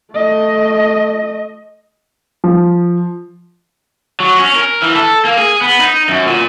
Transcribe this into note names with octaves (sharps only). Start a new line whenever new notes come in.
A3 D#5
F3
F#3
C#4
A#4
E3
A4
A#3
G#4
B3
D#4
F#2
A#2